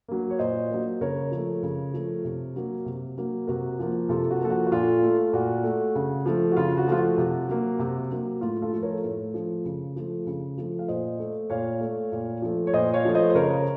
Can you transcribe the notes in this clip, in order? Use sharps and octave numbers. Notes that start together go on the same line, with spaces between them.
F#3 A#3
C#5
A#2 C5 D#5
F#3 A#3
C#3 A#4 C#5
F3
A3
C#3
F3 A3
C3
F#3 A#3
C3
F#3 A#3
C3 F#4 A#4
F3 A#3
C3 F4 A4
F#4
F3 A#3 A4
F#4
F#4
A#2 F4 A4
A3
A#2 F#4
A3
C#3
F3 A3
F#4
C#3 F4
F#4
F3 A3 F4
F#4
C3
F#3 A#3
C3
F#3 A#3
A2 F4
F4 A4
F3 A3
A#4 C#5
A2
F3 A3
C#3
F3 A3
C#3
F3 A3
F5
A#2 C5 D#5
A3
A#2 C#5 F5
A3
A#2
F3 A3
C#5
A#2 C5 D#5
C#5 F5
F3 A3
C5 D#5
C5
C#3 A#4 C#5